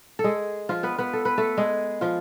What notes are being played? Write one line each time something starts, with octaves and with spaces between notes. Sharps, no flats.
A4
G#3 G#4
F3 F4
B3 B4
B3 B4
A4
B4
A3 A4
G#3 G#4
F3 F4